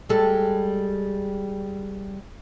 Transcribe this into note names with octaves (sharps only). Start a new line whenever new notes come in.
G3 G#3 A4